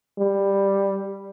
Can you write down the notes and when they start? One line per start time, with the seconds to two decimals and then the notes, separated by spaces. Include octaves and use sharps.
0.18 G3